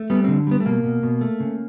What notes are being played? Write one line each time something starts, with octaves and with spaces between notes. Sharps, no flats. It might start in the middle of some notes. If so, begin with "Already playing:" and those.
Already playing: A3
G3 B3
D3 C4
G3 B3
A3
B2 A#3
B2
B2
A3
C#3